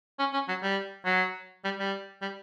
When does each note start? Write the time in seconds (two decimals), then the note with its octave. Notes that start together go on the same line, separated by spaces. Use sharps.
0.19 C#4
0.33 C#4
0.48 F#3
0.63 G3
1.05 F#3
1.65 G3
1.79 G3
2.22 G3